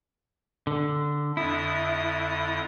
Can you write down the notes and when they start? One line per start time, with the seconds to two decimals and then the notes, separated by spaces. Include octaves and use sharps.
0.67 D3
1.37 F2 D3 E4 D#6